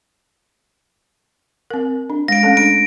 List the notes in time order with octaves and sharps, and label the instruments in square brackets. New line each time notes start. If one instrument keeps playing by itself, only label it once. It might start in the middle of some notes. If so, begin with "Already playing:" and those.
[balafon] C4 A#4
D4
[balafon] G#3 [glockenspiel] A#6 D7
[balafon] A3 C#4 A4
[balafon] D4 [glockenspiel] D7